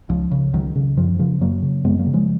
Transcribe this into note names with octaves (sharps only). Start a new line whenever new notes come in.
C#2 F3
C#3
C#2 D#3 F#3
C#3
F#2 F3
C#3 F3
F#2 F#3 A#3
C#3
F#2 G#3 B3
F#3 A#3
C#3
F3 G#3